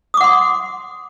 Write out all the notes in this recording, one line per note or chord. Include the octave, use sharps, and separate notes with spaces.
F#5 C6 D6 D#6